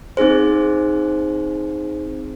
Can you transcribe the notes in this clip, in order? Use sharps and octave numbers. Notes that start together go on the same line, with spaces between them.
C4 D#4 G#4 C5